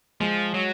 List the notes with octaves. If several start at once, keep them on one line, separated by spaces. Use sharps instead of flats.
F3 G#3
F#3